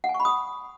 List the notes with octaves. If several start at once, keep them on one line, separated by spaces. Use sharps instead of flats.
F#5
G#5
C#6
B5
D#6